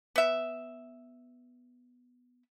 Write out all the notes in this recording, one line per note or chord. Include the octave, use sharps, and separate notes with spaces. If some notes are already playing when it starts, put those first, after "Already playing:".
B3 E5